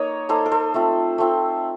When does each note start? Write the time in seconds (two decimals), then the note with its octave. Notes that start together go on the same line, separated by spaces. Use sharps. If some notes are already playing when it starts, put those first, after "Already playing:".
Already playing: A#3 D#4 A#4 C#5 D#5
0.29 A#3 D#4 A4 C5
0.46 A#4
0.51 A4 C5
0.74 A3 C4 F4
1.18 A3 C4 F4